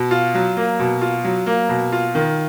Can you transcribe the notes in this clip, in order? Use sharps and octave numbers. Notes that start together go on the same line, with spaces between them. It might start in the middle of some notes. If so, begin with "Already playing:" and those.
Already playing: B2
F4
F#3
A#3
B2
F4
F#3
A#3
B2
F4
D#3